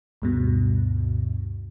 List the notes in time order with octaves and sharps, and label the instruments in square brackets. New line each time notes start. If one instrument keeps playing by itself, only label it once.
[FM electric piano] D2 G2 B2